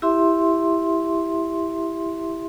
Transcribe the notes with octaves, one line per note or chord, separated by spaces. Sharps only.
E4 G4 E5 C6